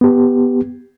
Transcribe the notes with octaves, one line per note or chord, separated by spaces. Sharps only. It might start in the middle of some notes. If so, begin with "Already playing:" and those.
B3 G4